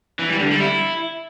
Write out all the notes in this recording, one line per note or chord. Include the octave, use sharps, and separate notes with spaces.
E3
G3
D3
G3
E4